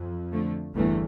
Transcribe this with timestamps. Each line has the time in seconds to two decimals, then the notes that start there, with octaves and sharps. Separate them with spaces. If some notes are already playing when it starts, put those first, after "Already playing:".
Already playing: F2
0.32 D3 F3 A3
0.75 G1 E2 G2 E3 A3